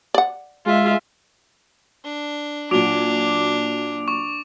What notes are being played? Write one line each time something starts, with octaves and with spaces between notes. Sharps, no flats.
D5 F#5
G#3 F4 E5
D4
A#2 F#3 D4 D6 D7 F7
C#6